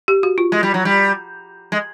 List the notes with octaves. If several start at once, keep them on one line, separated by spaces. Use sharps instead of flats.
G4
F#4
F4
G#3
G3
F#3
G3
G#3